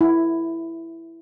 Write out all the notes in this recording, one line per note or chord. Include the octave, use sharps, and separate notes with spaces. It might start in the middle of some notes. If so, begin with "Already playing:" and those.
E4